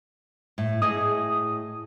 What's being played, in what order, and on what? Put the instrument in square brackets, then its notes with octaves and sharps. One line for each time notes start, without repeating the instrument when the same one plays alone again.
[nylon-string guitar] A2
[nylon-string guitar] A2 G#4 D#5 [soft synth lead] D#6